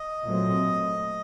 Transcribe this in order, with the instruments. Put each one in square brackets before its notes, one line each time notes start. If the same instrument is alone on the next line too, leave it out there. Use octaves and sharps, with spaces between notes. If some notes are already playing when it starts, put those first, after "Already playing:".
Already playing: [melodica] D#5
[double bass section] A#2 F#3 A3 C4